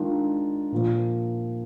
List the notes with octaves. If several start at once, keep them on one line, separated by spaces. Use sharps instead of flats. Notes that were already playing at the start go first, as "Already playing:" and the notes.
Already playing: D#3 G#3 D4 F4
A#2 F3 A#3